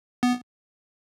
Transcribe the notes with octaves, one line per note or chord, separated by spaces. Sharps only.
B3